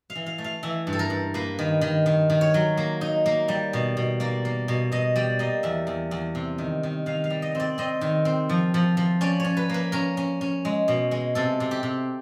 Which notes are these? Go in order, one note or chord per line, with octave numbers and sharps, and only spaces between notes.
F5
E3
F5
A3
F5
E3 E5
G2
A4
A#4
G2
A#3 B4
D#3
D#3
D#3
D#3
C#5
F#3
A#3
D#4
A#3
G3
B2
B2
A#3 D5
A#3
B2
B2 D#5
G3 D5
A#3 D#5
E2 E5
E2
E2
C3
D#3
D#3
D#3 F5
F5
G3
D#5
C4 D5
C4 D#5
D#3
C4
F3
F3
F3
C#4 D5
C#4 C#5
B4
A#3 B4
C#4 A#4
C#4
C#4
G#3
B2
G#3
C3 A4
C3
G4
C3